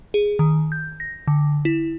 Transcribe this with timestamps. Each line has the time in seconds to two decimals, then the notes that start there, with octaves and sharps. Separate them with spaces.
0.14 G#4
0.39 D#3
0.72 G6
1.00 A#6
1.27 D3
1.65 E4